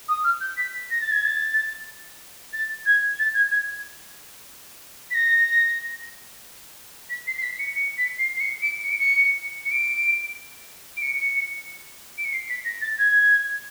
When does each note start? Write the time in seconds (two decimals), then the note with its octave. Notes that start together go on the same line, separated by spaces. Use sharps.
0.08 D#6
0.24 F6
0.41 G6
0.57 B6
0.90 A#6
1.01 A6
1.11 G#6
1.24 A6
2.53 A6
2.86 G#6
3.19 A6
3.34 G#6
3.51 G#6
5.11 B6
5.14 A#6
7.10 B6
7.27 C7
7.37 C7
7.42 B6
7.59 C#7
7.76 C#7
7.97 B6
8.18 C7
8.37 C7
8.40 C#7
8.62 D7
8.84 C#7
8.91 D7
8.99 C#7
9.65 C#7
9.71 D7
10.97 D7
11.02 C#7
12.18 D7
12.25 C#7
12.33 C7
12.49 B6
12.65 A#6
12.81 A6
12.98 G#6